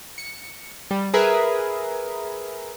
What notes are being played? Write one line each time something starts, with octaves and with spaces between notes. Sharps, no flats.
C#7
G3
G#4 A#4 B4 E5